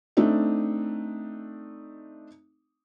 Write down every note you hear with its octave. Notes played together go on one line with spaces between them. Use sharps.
A3 C4 D4 D#4